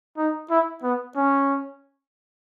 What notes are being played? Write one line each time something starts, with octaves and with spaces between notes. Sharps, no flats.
D#4
E4
B3
C#4